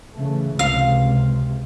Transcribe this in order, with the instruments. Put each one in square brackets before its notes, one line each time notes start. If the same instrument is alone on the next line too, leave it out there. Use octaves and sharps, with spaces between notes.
[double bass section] C#3 E3 A3
[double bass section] C#2 C3 [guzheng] F5